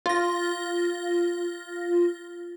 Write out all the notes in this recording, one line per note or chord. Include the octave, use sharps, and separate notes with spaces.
F4 A#6